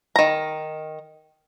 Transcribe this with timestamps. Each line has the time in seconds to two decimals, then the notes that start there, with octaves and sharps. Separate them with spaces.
0.16 D#3 A#5